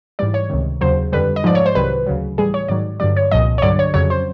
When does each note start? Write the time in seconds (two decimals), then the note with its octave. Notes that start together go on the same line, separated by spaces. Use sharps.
0.19 G#2 E3 G3 D5
0.34 C#5
0.50 C#2 C3 D#3
0.81 D#2 C#3 F#3 C5
1.12 F2 D3 G3 B4
1.36 D#5
1.44 G#2 F3 D5
1.55 C#5
1.66 C5
1.75 C2 C3 D#3 F#3 B4
2.06 D2 C#3 F#3
2.37 A2 E3 G3 G#4
2.54 C#5
2.68 G#2 D#3 F#3 D5
3.00 G2 D3 F#3 D5
3.17 C#5
3.32 C2 A#2 F3 D#5
3.58 C#5
3.62 G2 D3 F#3 D5
3.79 C#5
3.94 F2 C#3 F#3 C#5
4.10 C5